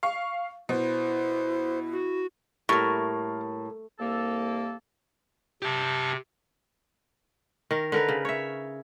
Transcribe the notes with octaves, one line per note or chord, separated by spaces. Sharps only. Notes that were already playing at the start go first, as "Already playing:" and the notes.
F5 C#6
B2 E4 C5
F#4
A2 G3 A#3 A#4 C#6
C2 A#3 A4
C3 G4 A5
D#3 A#4
D3 A#4 B4
C#3
C#5 E5